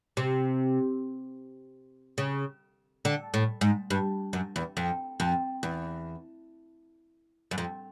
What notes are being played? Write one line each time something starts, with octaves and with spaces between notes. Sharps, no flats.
C3
C#3
D3
A2
G#2
G2
F#2
E2
F2
F2
E2
F#2
F2